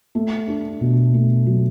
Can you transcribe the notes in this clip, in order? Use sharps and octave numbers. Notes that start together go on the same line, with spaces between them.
A3
D4
B2
A3
F#3